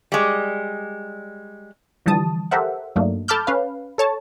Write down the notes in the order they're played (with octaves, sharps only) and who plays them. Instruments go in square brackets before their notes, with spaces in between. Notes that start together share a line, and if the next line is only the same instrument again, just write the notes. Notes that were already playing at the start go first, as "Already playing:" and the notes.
[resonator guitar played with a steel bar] G3 G#3
[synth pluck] D3 E3 F3 G3 A5 D#6
G4 A4 A#4 C5 E5 F#5
G2 F#3 A3 A#3 D4 D#4
A4 A5 B5 D6 F6 G6
C#4 B4 F5
A4 C#5 A5